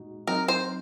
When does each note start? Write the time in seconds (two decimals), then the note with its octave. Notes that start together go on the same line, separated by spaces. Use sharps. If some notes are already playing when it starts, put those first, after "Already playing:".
Already playing: A#2 G#3 D#4 F#4
0.27 F#3 C4 D#4 A#4
0.48 C5